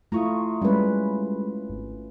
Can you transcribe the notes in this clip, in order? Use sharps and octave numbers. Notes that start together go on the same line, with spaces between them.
A3 E4 F4 A#5 C#6 D#6
G3 G#3 C#4 B4
G#1